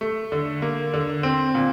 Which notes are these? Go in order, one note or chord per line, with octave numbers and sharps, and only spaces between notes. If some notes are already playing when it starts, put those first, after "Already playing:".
A3
D3
A#3
D3
C4
A#2